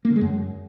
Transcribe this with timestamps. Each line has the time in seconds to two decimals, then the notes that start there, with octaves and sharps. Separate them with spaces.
0.05 A#3
0.10 D3
0.16 G#3
0.21 F#2